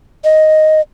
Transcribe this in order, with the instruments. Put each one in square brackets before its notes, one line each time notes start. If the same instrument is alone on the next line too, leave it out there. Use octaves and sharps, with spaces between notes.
[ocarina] D#5